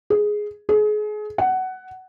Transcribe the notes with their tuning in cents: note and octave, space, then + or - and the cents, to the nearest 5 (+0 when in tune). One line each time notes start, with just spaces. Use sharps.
G#4 +5
G#4 +30
F#5 +15